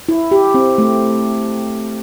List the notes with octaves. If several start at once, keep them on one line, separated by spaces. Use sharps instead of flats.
E4
G4
C4
A3